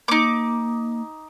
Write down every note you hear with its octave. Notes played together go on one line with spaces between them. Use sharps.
A#3 D#4 D6